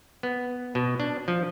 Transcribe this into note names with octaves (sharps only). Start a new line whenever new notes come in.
B3
B2
D4
F3